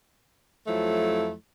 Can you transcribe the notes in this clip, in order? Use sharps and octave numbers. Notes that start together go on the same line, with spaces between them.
F2 F3 F#3 A3 E4